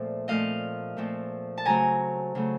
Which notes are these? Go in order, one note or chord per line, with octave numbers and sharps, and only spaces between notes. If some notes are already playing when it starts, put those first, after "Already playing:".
Already playing: A#2 F3 A3 C4 D5 E5
A#2 F3 A3 C4 D#5 F5
A#2 F3 A3 C4
A5
C#3 F#3 A3 C4 G#5 A#5
C#3 F#3 A3 C4